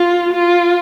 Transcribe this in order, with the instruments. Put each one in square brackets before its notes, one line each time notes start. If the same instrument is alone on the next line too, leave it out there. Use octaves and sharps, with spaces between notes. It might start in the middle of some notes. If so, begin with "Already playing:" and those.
Already playing: [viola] F4
F4